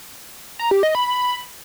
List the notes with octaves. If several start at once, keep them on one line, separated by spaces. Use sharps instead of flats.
A#5
G4
D#5
B5